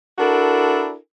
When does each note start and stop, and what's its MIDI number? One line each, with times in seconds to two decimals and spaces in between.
0.19 0.95 62
0.19 0.95 64
0.19 0.95 66
0.19 0.95 69
0.19 0.95 70